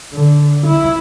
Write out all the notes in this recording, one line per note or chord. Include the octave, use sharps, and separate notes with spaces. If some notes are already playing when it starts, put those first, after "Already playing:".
D3
E4